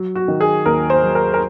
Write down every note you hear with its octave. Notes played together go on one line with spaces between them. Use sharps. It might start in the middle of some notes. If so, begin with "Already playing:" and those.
Already playing: F#3
F#4
D#3
G#4
D#2 A#4
C5
F#3
A#4
A#4